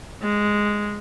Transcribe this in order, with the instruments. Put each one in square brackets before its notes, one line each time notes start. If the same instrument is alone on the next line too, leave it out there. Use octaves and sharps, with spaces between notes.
[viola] G#3